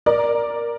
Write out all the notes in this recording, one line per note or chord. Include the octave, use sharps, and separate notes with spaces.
A#4 D5